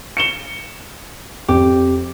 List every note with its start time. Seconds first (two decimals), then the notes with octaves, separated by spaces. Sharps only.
0.17 C#7 E7 G7
1.48 F2 G4